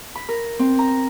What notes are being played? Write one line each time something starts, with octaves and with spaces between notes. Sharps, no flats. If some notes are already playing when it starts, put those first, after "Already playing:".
B5
A#4
C4
A#5